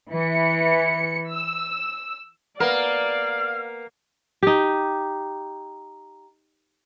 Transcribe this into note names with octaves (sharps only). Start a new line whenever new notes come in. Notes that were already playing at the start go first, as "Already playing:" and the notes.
E3 C#7
E6
A#3 B3 A#4 D5 F5
D#4 G4